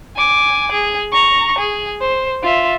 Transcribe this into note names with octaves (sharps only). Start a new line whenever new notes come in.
G#5 D6
G#4
A#5 C#6
G#4
C5
F4 E5